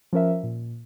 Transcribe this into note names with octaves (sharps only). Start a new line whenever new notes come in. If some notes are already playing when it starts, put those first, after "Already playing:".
F3 C#4 A#4 E5
A#2